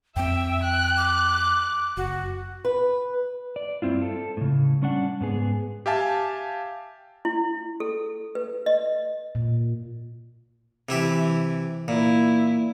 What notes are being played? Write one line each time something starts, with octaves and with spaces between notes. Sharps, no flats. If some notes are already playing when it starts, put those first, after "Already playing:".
F2 C4 E5 G5
F#6
D6
F#1 F#4
B4
D5
G2 C4 E4 F4
A4
A2 C#3
G3 C#4 D4 F#5
G#2 B3 G#4
G4 E5 F5 G#5 A5
E4
A4
B4
D#5
A#2
C3 E3 E4 G4
A#2 E4